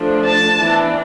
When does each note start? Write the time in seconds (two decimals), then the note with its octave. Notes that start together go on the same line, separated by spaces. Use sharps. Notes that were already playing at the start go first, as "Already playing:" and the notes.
Already playing: F3 A3 D4
0.24 A5
0.58 E3 B3 D4